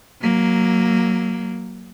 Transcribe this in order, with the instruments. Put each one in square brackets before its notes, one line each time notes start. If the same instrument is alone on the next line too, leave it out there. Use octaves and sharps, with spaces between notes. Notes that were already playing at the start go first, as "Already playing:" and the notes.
[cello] F#3 A#3